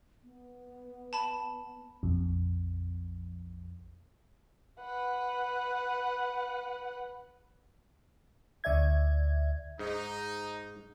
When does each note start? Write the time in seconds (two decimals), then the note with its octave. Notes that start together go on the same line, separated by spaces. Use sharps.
0.24 B3
1.13 A5 B5 E7
2.03 A#1 F2
4.80 B4 F#5
8.64 D2 D3 D5 E5 G#6
9.79 G#2 D#4